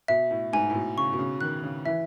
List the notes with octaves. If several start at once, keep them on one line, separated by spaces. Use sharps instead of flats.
B2 E5
A2
G#2 G#5
A2
B2
C#3 C#6
B2
C#3
D#3 F#6
C#3
E3 E5